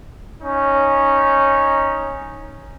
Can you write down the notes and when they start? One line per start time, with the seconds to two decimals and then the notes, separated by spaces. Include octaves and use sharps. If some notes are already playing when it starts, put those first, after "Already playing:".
0.41 C#4 D#4